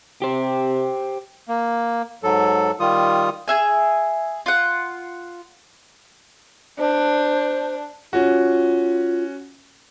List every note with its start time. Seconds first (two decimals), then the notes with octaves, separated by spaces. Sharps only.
0.22 C3 G4 C5
1.49 A#3
2.23 G#2 F#3 A4
2.80 D#3 G3 F4 D#6
3.48 G#4 E5 G#5
4.46 F4 F#5
6.79 D4 C5
8.13 C#4 F4 F#4